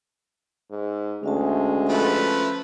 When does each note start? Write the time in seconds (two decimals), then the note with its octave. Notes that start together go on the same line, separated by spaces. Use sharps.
0.71 G#2
1.24 D2 G#3 C#4 E5 A5
1.89 F3 A3 B4